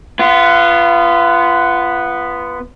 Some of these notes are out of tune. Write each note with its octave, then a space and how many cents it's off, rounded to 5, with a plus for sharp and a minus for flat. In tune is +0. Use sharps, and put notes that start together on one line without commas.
B3 +0 F4 -30